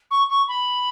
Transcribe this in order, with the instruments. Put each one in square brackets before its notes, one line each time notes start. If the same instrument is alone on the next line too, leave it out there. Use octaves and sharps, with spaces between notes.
[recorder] C#6
C#6
B5